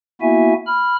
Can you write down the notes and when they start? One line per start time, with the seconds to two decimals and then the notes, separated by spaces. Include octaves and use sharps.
0.21 A#3 B3 E4 F#4 E5 G#5
0.66 B5 F6